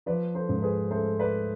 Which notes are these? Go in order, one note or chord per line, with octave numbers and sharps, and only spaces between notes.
F3 B4 D5
A4 C5
G#2
G#4 B4
A3 A4 C5
B4 D5